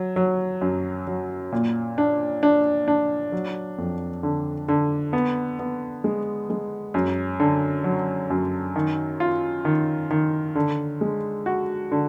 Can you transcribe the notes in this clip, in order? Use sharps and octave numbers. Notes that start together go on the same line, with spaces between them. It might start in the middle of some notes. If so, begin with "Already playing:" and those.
Already playing: F#3
F#3
F#2
F#3
A#2
D4
D4
D4
F#3
F2
D3
D3
B3
B3
G#3
G#3
F#2
D3
F#3
F#2
D#3
F4
D#3
D#3
D3
G#3
F#4
D3